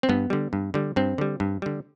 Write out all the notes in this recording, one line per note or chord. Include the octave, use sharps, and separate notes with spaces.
C4
G2 B3
D3 G3
G2
D3 G3
G2 C4
D3 G3
G2
D3 G3